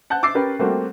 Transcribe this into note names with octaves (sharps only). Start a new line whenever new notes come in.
F#5 A5 F#6 G6
D6 E6 A6 C7
C#4 G4 A#4 B4
G3 A3 A#3 C4 F#4